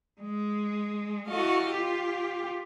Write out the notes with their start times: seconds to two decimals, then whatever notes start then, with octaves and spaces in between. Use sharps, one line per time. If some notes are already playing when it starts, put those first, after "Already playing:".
0.22 G#3
1.27 E4 F#4 A4 D#5 F5
1.70 F4 G4